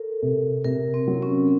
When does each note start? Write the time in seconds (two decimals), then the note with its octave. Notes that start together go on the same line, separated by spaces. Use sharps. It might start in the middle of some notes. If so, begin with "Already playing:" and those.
Already playing: A4 A#4
0.22 C3
0.64 C3 A#4
0.94 C4
1.08 F#3
1.22 C#4